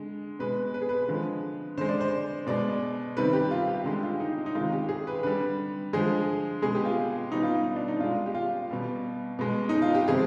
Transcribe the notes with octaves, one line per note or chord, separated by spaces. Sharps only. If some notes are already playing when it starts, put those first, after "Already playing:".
Already playing: D3 G#3
B2 G#3 B4
B4
G#4
B4
D3 F3 G#3
D3 G#3 C5
D5
C5
B2 G#3 D5
C3 D#3 G3 B4
G4
F4
G4
D3 G#3 G4
F4
D#4
D#4
C3 D#3 G#3 F4
G4
G#4
B4
D3 G3 B4
D3 F3 G#3 G#4
B2 G#3 G#4
G4
F4
B2 G3 D#4
F4
D#4
D4
D#4
B2 G#3 F4
G4
F4
B2 G3
B2 G#3
D#4
F4
G4
C3 F3 G#3 G#4